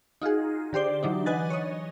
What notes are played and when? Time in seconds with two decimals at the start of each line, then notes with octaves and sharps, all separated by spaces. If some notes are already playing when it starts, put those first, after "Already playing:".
0.22 D#4 F4 F#4 G#4
0.73 D3 G4 C5 D5 G7
1.03 E3 F#3 D4 D#4
1.26 B4 D#5 F#5 G#5 F#6 A6
1.50 C#5 D#5